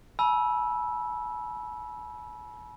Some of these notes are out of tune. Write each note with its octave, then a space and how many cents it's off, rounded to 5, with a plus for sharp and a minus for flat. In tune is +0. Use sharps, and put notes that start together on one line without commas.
G#5 +45 B5 -30 E6 +0